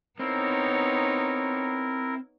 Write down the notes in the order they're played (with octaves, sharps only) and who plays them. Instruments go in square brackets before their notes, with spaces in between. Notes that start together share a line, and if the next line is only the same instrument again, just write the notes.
[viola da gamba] B3 D#4 C#5 [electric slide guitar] C4 [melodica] E4 A#4